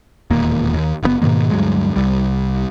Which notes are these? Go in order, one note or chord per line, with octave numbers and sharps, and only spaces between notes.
E1 D#2 A#2 A#3
D#2
F#1 C#3 B3
G#2 B2 D#3 A#3
D2 G2 F#3 G#3
C2 G3